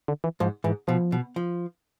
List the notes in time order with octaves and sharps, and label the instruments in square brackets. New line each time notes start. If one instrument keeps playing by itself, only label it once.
[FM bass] D3
E3
[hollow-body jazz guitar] G#2 [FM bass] F3
[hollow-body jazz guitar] G#2 [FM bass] E3
[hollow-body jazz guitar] B2 [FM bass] F3
[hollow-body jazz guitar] B2
F3